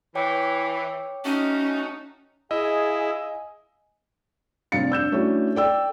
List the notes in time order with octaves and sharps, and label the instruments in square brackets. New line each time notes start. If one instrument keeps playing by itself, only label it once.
[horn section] E3 [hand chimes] C#5 G5 D6
[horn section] A3 D#4 F#4 [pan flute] C#4
[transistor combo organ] E4 [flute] G#4 [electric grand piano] D#5 [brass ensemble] F5 G#5
[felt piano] F1 G2 F5 A6 C#7
D4 E6 G6 E7
A3 C#4 D4 E4 F#4
A4 D5 G5 E6